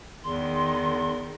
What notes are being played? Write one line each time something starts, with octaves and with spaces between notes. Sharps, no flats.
E2 D#3 C6